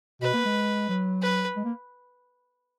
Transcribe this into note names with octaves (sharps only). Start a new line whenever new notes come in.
B2 B4
A#3
G#3
F#3
B4
G#3
A#3